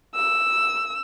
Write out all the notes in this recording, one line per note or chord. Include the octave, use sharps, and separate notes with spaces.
E6